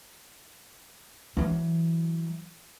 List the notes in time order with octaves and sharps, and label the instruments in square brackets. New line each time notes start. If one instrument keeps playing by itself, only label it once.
[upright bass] E3 F#3